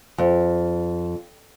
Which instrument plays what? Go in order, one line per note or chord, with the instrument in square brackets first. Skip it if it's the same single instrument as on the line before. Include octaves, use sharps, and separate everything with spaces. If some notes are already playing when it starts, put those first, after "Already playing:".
[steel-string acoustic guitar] F2